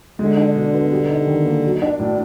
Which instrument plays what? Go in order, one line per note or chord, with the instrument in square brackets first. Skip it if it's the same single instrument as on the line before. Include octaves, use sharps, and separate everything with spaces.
[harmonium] D3 [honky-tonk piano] G#3
[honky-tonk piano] D4
B2
B3
G3
D#4
D#3
A#3
F#3
D4
A2